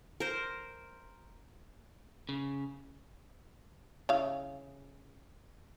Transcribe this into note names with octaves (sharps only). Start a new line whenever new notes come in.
A#4 C5
C#3
C#3 E4 F5